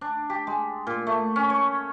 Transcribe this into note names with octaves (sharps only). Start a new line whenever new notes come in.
D4
G4
G#3
A#2
A3
C#4
C#5